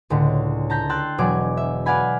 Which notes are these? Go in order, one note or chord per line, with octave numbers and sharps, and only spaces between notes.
C#2 A2 D3
A5 A#5 G6 A#6 B6
G5 C6 E6 F#6 A6
E1 B2 F#3 D5 G#5 D6
E5
B4 D5 F5 F#5 G#5 B5